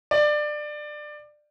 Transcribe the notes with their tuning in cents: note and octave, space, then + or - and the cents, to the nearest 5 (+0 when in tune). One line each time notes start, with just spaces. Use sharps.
D5 +20